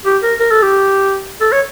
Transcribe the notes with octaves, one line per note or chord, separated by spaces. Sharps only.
G4
A#4
A#4
A4
G4
A4
C#5